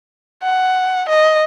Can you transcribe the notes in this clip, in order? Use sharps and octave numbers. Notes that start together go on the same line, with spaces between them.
F#5
D#5